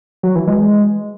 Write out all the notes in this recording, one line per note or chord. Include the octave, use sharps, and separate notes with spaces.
F#3
E3
G#3